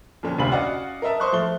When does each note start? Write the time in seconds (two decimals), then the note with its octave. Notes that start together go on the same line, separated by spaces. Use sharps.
0.23 F2 A#2 D3 C#4
0.38 F1 D2 C3 F5 B5 F#7
0.52 C#4 F#4 D5 D#5 F5 F#5
1.02 A#4 D#5 E5 A5
1.20 C5 C6 C#6 D#6 F#6
1.32 F3 A3 G7